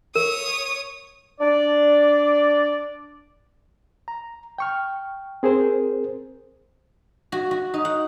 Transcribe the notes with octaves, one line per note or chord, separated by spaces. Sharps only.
A#4 C#5 D#6
D4 D5
A#5
G5 C#6 F6
C4 G#4 A#4 C5
F#4
F#4
D#4
F#5